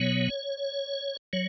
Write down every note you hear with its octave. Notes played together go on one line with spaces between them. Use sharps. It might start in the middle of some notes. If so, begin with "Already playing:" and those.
Already playing: B2 F#3 B3 C#5
F#3 C#5